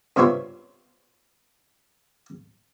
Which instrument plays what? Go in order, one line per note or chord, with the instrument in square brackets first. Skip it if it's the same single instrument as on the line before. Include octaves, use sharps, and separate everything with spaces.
[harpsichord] G2 C3 B3 F4 C#5 E5